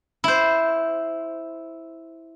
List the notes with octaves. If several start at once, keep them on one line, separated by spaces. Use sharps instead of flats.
E4 C5